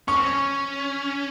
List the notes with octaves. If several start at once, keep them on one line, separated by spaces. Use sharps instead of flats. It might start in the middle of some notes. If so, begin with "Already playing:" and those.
C#4 C#6
C4
C#4